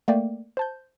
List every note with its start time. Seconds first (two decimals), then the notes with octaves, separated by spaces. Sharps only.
0.08 A3 A#3 D5 G5
0.57 C5 A5 G6